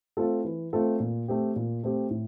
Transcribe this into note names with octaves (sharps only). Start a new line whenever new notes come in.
A3 C4 F4 A4
E3
A3 C4 F4 A4
A#2
A3 C4 G4
A#2
A3 C4 G4
A2